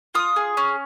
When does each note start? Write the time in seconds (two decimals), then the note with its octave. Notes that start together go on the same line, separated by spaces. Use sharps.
0.15 F4 D#6
0.36 G#4
0.57 C#4